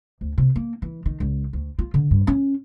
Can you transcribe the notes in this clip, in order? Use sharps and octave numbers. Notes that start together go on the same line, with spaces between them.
D2
C3
A#3
E3
D#3
C#2
D2
F4
D3
G2
C#4